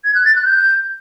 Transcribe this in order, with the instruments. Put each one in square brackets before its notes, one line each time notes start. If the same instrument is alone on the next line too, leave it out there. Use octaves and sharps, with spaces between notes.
[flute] G#6
F#6
A6
F#6
G6